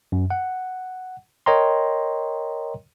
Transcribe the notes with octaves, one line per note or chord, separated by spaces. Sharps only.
F#2
F#5
A#4 C#5 D#5 G5 A#5 C6